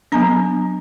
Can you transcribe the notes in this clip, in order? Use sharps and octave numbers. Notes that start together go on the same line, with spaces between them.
F#3 B3 D4 A#5